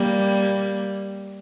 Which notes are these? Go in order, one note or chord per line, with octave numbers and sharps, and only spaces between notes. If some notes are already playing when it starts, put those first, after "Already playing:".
Already playing: G3 A#3